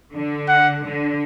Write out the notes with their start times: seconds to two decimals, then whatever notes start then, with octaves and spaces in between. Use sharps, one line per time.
0.14 D3
0.48 F#5
0.84 D3